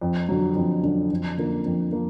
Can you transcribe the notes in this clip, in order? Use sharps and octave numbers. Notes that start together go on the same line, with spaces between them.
F2
D3 F#3
F2
D3 F#3
F2
D3 F3 A#3
F2
F3 A#3